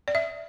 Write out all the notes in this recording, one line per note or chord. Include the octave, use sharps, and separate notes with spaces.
D5
E5